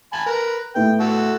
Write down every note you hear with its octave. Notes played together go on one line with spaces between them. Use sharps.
G#5 A5 B5 F#7
A#4 B4
A2 A3 B3 G5
F#4 A4